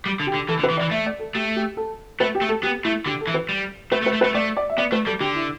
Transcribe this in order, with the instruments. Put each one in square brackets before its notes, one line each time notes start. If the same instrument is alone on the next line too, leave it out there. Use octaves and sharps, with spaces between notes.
[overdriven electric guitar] G3
D3
[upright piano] G4
[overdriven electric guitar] D3
[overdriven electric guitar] E3 [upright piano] A4
[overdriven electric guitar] D3
[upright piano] B4
[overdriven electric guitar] E3
[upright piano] D5
[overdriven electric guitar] E3
[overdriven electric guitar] A3 [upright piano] E5
[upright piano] D5
A4
[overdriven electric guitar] A3 [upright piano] G4
[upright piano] G4
A4
[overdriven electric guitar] A3 [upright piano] B4
[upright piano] G4
[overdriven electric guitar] A3
[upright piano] A4
[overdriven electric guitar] B3 [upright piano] G4
[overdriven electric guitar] A3 [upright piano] E4
[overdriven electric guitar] D3 [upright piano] G4
[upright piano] A4
[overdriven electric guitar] E3
[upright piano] B4
[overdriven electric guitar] G3
[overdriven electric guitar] A3 [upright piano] B4
[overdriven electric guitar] A3
[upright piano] B4
[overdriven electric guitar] A3
[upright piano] B4
[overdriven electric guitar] A3
[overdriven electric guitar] A3 [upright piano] D5
[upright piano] D5
E5
[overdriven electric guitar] B3 [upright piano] D5
[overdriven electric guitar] A3 [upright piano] B4
[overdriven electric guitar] G3 [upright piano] A4
[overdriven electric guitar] D3 [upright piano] G4
[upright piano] E4